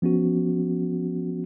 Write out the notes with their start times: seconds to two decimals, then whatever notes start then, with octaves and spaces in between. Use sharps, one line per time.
0.02 F3 B3 C#4 F#4